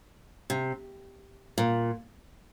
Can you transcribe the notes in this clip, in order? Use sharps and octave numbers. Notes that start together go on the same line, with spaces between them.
C3
A#2